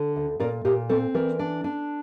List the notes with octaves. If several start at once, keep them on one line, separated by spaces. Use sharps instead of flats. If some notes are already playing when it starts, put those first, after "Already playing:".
Already playing: D3
D2
A#2 A#4 D5
A#2 G4 A#4
C4 A4 C5
E3 A#4 D5
D4
D4